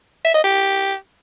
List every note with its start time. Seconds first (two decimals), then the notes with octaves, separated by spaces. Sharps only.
0.25 E5
0.34 D#5
0.44 G4